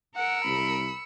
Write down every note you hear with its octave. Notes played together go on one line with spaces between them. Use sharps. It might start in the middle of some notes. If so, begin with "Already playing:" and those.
A#4 F#5 E6 C#7
C2 B5